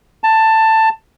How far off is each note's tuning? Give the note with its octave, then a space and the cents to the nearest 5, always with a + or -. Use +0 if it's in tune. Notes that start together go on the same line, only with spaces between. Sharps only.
A5 +10